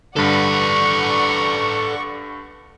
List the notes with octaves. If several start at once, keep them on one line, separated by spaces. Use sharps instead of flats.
G2 D3 A4 B4 D5 F#5 C#6